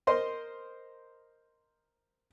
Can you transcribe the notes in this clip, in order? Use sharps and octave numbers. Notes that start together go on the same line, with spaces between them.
A#4 C5 D#5 C6